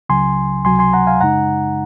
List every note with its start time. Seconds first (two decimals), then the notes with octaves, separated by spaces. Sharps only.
0.09 C#2 C#3 F#3 G#5 C6
0.65 C#2 C3 F#3 G#5 C6
0.79 G#5 C6
0.93 F#5 A#5
1.07 F5 G#5
1.21 F#2 C#3 G#3 D#4 F#5 A#5